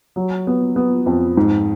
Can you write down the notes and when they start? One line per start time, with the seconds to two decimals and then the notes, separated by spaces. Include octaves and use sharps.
0.16 F#3
0.47 B3
0.76 B3
1.06 F2
1.37 G#2